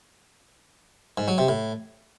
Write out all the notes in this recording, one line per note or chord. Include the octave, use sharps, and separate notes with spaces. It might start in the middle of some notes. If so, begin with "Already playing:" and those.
G#2
F#3
C3
A2